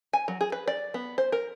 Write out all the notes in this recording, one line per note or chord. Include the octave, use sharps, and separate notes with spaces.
G#5
F#3
G#4
B4
D5
B3
C5
A#4